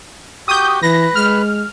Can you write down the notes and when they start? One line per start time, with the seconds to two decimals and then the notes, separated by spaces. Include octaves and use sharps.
0.48 F#4 G4 D#6 G6
0.82 E3 B4 A#6
1.15 G#3 F6